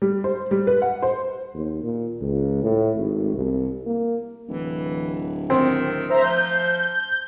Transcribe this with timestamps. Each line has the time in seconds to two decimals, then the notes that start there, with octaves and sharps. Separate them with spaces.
0.02 G3
0.24 C5
0.51 G3
0.67 B4
0.82 F#5
1.02 C5
1.54 D#2
1.83 A#2
2.21 C#2
2.63 A2
2.97 G#1
3.34 C2
3.86 A#3
4.49 D1 E3
5.50 D#3 C4
6.10 C5 E5 A#5
6.24 F3 G6